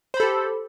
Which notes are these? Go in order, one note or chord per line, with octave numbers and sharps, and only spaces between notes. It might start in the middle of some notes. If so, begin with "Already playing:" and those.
G4 A4 C5 B5